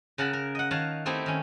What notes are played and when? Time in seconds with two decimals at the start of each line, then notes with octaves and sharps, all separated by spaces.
0.18 C#3 A#4 F#5 A5 B5
0.33 A#4
0.55 D#5 F#5
0.71 D#3 C#5 F5 F#5 A5
1.06 A3 C4 D#4 E4 G4
1.26 D#3 C#4